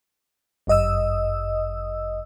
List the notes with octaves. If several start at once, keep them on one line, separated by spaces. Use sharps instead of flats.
G1 F#2 D#5 D#6 E6